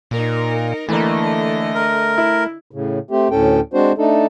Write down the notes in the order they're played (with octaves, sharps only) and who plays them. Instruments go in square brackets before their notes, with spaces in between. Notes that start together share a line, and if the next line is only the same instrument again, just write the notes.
[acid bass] A#2 [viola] D#4 A#4
[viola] D3 D#5 [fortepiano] E3 A#3 [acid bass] A3
[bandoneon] A#4
[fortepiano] E4
[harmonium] A2 C#3
A3 C4 G4
D2 A2 C#4 A4 G5
G#3 C4 D4 F#4 C5
A3 D4 D#4 A4